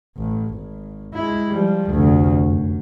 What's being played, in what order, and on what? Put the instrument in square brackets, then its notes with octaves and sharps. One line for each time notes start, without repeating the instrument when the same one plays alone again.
[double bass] A1
G#1
G#3 E4
F3 G3
F1 D2
F#2